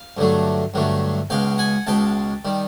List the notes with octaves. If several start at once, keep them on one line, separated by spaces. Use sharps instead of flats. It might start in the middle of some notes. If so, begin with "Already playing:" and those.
Already playing: F5
G2 D3 F#3 A3
G2 D3 F#3 A3
C#2 B2 G#3 F5 G5
F#5 G#5
C#2 B2 G#3 G5 A5
D#3 G3